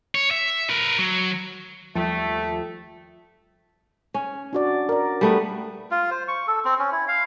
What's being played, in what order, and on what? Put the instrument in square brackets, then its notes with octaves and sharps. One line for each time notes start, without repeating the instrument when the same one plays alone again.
[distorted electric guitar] C#5
E5
A#4 B4
F#3
[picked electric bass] D#2 G3 [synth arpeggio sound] F3 [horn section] A3 [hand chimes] A4 G5 A5
[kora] C#4
[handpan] D4 F#4 D5
A#4 D5
[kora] G3 A3 B3
[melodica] F4
C5
C#6
A4
C4
C#4
E4
F5